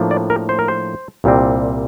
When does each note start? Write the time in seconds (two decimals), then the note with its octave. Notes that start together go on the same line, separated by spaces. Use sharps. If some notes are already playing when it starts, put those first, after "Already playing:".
Already playing: A2 F3 A#3 D4
0.11 D5
0.30 A#4
0.49 C5
0.59 A#4
0.68 C5
1.24 C2 A#2 G3 C4